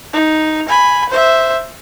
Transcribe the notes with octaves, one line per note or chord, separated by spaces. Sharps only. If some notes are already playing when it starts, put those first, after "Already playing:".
D#4
G#5 B5
C5 E5